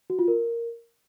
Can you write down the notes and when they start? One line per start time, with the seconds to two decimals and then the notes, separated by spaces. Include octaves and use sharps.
0.10 F#4
0.19 F4
0.28 A#4